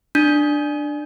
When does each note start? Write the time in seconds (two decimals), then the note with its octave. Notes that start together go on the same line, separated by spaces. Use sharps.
0.15 D4 G6